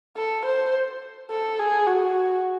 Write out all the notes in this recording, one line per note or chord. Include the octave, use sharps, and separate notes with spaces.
A4
C5
A4
G#4
F#4